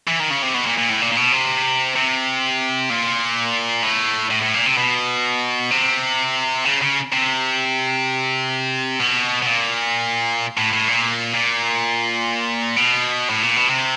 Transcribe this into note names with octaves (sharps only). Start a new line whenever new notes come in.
E3
D#3
C#3
C3
B2
A#2
A#2
A2
A#2
A#2
B2
C3
C3
A#2
A2
A2
A2
A#2
C3
B2
C3
C#3
C#3
C3
B2
B2
A#2
A2
A2
A#2
A#2
B2
A2
A#2
B2
C3